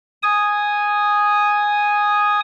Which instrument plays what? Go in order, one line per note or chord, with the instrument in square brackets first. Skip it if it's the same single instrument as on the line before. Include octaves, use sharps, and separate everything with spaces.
[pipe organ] G#5 D#6